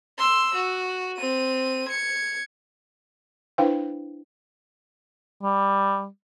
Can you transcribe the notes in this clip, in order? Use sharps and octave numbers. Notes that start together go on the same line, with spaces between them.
C6 E6
F#4
C4 D#7
G#6 C#7
D4 E4 B4 C5 F5 G5
G3